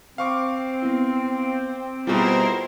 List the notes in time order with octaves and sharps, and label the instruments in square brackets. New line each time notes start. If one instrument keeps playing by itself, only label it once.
[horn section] C4 [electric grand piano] F5 C#6 D6
[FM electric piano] B3 E4
[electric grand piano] B2 G3 [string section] E4 A#4 C5 [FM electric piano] F4 G#4 G5